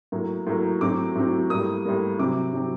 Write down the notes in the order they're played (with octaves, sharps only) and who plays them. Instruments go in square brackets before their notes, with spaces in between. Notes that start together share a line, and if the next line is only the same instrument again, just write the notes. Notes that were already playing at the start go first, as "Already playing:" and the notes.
[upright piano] A2 F#3 A#3
A2 F#3 A#3
A2 F#3 C4 D6
A2 F#3 C4
A2 G3 A#3 D#6
A2 G3 A#3
C3 F#3 C4 D6
C3 F#3 C4